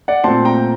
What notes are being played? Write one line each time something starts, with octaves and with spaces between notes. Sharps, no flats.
D5 F#5
A#2 A3 C4 A5 C6
G5 A#5